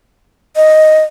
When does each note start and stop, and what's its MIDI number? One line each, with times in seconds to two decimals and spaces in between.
0.56 1.03 75